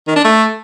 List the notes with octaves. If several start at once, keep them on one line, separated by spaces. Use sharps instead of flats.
D#3
D4
A3